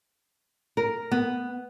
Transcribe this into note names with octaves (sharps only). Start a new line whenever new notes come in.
A#4
B3